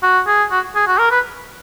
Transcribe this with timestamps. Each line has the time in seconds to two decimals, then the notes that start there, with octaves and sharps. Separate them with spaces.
0.03 F#4
0.27 G#4
0.51 F#4
0.75 G#4
0.87 F#4
0.99 A#4
1.11 B4